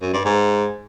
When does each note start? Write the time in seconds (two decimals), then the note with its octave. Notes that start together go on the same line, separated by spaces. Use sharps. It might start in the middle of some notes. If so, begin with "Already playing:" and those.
0.01 F#2
0.13 G2
0.25 G#2